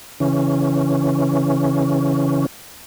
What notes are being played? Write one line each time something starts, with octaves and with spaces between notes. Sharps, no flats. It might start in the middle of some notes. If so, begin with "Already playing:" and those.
C#3 E3 C#4